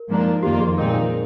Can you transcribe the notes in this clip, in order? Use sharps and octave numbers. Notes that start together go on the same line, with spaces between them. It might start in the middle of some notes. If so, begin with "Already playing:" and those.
Already playing: A#4
G#2 F3 A#3 D4
F2 D#3 A#3 F4 G4
G#4
A#2 F3 G#3 C4 D#4 A#4